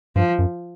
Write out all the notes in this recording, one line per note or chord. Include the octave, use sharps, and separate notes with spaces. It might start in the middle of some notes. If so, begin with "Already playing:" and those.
G2 F3
F#2